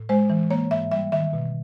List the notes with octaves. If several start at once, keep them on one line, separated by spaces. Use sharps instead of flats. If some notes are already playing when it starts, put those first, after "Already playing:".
Already playing: A2
G#3 C5
E3
A#3 C#5
G#2 E5
G3 E5
D#3 E5
B2